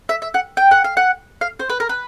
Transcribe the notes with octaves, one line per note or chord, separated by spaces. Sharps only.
E5
E5
F#5
G5
F#5
F5
F#5
F5
C5
B4
A#4
B4